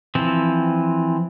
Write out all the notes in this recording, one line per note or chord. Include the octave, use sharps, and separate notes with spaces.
E3 F3 C4